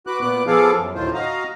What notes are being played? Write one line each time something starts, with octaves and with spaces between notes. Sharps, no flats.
F#4 B4 D6 F#6
A#2 B3 D6 F#6
F3 B3 G#4 A4 F5 D6
F#2
D2 A2 D#3 F4 C5
F#4 D#5 F5 A#5